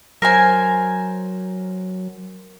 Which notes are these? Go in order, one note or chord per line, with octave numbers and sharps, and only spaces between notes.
F#3 A#4 C5 G#5